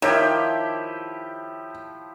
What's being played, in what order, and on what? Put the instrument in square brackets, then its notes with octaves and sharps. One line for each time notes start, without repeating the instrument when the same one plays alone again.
[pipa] D#3 [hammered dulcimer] F3 E4 G4 [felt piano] C#5